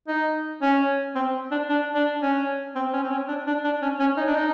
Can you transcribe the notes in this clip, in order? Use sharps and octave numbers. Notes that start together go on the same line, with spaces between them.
D#4
C#4
C4
D4
D4
D4
C#4
C4
C#4
C4
C#4
D4
D4
D4
C#4
C#4
D#4
D4
D#4